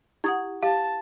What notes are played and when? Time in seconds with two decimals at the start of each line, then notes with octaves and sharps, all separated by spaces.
0.24 E4 G4 F#5 D#6 G#6
0.63 G4 F5 A5